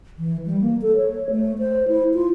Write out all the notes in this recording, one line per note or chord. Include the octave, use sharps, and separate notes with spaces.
E3
G3
A#3
A4
C#5
A3
C5
E4
F4